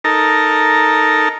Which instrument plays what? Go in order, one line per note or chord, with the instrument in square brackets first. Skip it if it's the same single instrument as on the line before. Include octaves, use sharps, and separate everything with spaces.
[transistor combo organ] D#4 A4 A#4